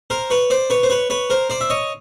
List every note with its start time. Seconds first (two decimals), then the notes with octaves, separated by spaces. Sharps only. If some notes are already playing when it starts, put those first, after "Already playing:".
0.10 A#4 C5
0.30 B4 C#5
0.50 C5 D5
0.70 B4 C#5
0.83 C5
0.90 B4 C#5
1.10 B4 C#5
1.30 A#4 C5
1.50 C5 D5
1.61 E5
1.70 C#5 D#5